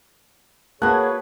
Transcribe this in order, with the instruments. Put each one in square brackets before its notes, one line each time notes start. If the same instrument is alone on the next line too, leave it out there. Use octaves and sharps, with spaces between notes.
[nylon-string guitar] A#3 F#4 [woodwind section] G#4 B4 C#5 [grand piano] A5 F#6